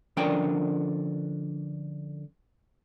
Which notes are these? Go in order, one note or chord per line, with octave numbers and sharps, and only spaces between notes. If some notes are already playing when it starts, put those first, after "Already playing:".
D3 F3 C#4 D4 A#4 G5